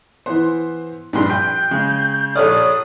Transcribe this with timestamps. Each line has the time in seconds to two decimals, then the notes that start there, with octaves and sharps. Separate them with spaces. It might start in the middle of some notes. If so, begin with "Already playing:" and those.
0.26 E3 B3 C5
1.13 A#1 G2 G3 C6
1.30 G5 G6
1.71 C#3 G#3
2.35 A#1 A4 C#5 D5 D#6 F6